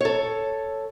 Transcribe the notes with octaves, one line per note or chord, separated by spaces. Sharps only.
A4 C#5